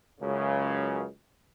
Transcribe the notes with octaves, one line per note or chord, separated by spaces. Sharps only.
C#2 F#2 C#3